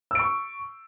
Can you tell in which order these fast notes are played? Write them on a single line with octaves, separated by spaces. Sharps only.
E6 D7 C#6